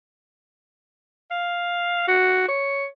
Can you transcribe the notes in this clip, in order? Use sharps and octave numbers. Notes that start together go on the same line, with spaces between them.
F5
F#4
C#5